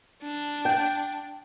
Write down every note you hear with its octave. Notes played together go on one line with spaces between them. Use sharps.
D4
G5